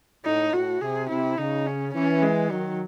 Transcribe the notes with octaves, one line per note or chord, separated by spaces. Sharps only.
A2 D#4
A2 F#4
C3 G#4
C3 E4
C#3 D#4
C#4
E3 C#4
G#3
D#3 F#3